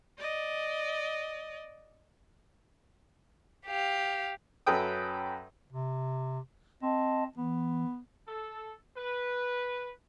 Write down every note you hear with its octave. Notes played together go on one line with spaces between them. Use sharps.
D5 D#5
G4 F5
F#2 C#4 A4 B4 G5 D#6
C3
C4 D#5 A5
E3 B3
A4
B4